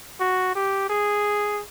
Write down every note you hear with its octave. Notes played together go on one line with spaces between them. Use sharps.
F#4
G4
G#4